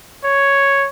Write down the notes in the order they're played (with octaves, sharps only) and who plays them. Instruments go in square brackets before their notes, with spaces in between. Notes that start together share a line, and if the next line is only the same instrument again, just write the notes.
[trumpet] C#5